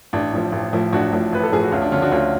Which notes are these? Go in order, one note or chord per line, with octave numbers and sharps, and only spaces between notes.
A1 D4
A2 F3
A1
A2 F3
A1 D4 F#4
A2 F3
A1 B4
A4
A2 F3 G#4
F#4
D2 C#4 F4
D4
D3 F3 C#4 F4
D4 F#4
D2 C#4 F4